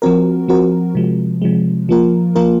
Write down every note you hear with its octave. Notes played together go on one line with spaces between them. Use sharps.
F3 C4 F#4 A#4
F3 C4 F#4 A#4
C3 F3 G#3
C3 F3 G#3
F3 A#3 F4 A#4
F3 A#3 F4 A#4